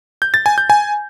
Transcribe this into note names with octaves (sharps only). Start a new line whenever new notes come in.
G6
A6
G#5
G6
G#5